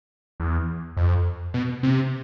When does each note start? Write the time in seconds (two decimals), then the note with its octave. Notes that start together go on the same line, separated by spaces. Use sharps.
0.40 E2
0.97 F2
1.54 B2
1.83 C3